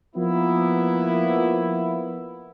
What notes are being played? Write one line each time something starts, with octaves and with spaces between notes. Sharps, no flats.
F3 A#3 B3 E4